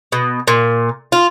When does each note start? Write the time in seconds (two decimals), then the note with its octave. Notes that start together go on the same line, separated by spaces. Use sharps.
0.12 B2
0.48 A#2
1.12 F4